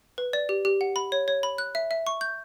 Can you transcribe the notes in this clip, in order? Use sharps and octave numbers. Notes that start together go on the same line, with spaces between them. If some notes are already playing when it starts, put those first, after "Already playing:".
B4
D5
G4
G4
F#5
B5
C#5
C#5
B5
F#6
E5
E5
C#6
G6